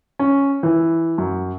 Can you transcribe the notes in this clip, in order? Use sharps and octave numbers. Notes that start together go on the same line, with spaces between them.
C#4
E3
F#2